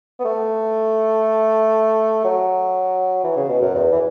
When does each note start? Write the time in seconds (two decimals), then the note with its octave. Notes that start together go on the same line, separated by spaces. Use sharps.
0.19 B3
0.24 A3
2.24 F#3
3.24 E3
3.36 C#3
3.49 B2
3.61 F#2
3.74 E2
3.92 E3